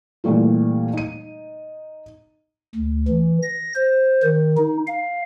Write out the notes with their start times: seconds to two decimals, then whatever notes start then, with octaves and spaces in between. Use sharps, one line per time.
0.24 A#2 E3 G3 A3 F4
0.94 D#4 D#7
2.75 D2
3.08 E3
3.42 A#6
3.75 C5
4.23 D#3
4.57 D#4
4.88 F5